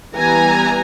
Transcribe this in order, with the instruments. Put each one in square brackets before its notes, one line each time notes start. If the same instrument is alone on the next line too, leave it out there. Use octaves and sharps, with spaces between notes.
[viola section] E3 G3 B3 G#5 A#5